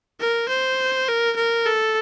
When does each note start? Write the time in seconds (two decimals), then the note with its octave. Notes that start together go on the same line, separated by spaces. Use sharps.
0.21 A#4
0.49 C5
1.08 A#4
1.36 A#4
1.66 A4